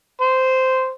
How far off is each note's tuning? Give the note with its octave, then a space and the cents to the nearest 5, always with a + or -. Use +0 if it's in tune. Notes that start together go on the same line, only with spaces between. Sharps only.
C5 -10